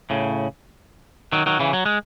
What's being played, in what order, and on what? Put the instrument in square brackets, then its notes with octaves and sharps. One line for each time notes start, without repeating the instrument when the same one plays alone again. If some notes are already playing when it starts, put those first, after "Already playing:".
[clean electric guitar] A2 C#3
D#3 F#3
D#3 F#3
C#3 E3
F#3
G#3